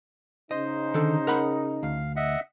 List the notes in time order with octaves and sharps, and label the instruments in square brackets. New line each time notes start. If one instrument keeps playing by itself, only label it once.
[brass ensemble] C#3 D#4 [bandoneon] C5 [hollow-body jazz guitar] D#5
[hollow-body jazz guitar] D3 D#3 A4
A#4 F#5 B5
[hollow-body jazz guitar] D2 [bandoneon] F5
[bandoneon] D#5 E5 F#5